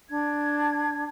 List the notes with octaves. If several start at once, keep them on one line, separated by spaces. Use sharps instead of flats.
D4 G#6